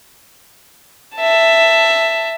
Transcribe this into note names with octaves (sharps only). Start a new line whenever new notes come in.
E5 A5